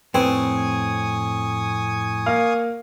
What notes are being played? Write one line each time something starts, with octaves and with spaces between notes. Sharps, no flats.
F2 A2 C4 B4 G#5 C#6 D#6
A#3 F5